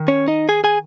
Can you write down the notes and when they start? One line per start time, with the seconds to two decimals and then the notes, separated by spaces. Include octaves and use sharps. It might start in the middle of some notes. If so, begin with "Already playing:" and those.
Already playing: D#3
0.08 C#4 C#5
0.28 D#4 D#5
0.49 G#4 G#5
0.64 G#4 G#5